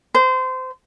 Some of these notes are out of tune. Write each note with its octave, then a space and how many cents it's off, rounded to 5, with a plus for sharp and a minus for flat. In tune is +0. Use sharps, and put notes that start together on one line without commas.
C5 -25